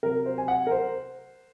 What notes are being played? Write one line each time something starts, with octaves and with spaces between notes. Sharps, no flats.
C3 F#3 A#4
C5
G#5
F#5
A#4
C5